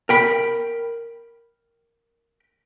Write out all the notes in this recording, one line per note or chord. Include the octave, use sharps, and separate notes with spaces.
A#4 G5 B5